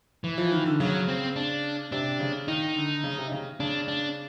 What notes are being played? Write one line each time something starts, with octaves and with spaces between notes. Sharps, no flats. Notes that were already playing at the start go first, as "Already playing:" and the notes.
E3
F3
D#3
D3
C#3 F#3
C4
D4
C3 D4
C#3
D#3 D#4
D3
C#3
C3
C#3
C#3 D4
D4